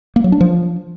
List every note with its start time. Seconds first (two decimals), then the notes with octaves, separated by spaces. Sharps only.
0.16 A#3
0.24 F#3
0.32 D4
0.41 F3